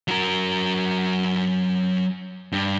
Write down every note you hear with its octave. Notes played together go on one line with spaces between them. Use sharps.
F#3 A#4
G2